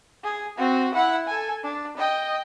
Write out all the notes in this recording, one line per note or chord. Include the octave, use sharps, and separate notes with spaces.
G#4
C4 F#4
E4 F#5
A4 G#5
D4
D#5 G5